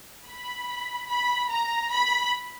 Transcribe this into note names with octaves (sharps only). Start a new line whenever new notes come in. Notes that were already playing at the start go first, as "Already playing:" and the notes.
B5
B5
A#5
B5